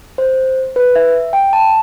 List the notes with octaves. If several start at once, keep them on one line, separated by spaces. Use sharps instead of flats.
C5
B4
E5
G5
A5